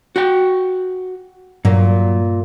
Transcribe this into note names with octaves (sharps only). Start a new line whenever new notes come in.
F#4 G5
G2 A#2 F#3 A#3